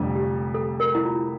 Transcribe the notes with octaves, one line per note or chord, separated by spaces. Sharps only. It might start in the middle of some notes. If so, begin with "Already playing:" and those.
Already playing: F1 F2 D3 G3
G4
A4
A#4
E4
F4